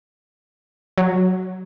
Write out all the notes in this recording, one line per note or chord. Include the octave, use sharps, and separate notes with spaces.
F#3